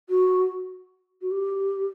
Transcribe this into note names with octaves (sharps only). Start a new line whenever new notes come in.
F#4
F#4
G4